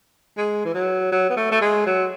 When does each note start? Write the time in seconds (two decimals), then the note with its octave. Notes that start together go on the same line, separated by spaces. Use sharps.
0.37 G#3
0.65 E3
0.74 F#3
1.12 F#3
1.30 B3
1.36 A3
1.51 A3
1.61 G#3
1.86 F#3